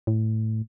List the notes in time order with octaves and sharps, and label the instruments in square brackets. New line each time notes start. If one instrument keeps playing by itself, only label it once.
[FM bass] A2